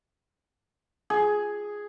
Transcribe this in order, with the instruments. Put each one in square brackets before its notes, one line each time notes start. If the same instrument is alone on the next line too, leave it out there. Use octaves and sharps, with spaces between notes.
[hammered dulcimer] G#4